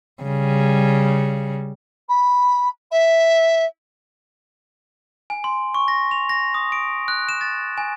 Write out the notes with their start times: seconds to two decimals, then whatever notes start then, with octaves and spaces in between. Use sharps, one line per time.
0.23 C#3 G3
2.09 B5
2.91 E5
5.30 G#5
5.44 C6
5.74 C#6
5.88 A#6
6.11 F7
6.29 A#6
6.54 D#6
6.72 D7
7.08 F#6
7.29 E7
7.41 A6
7.78 G#5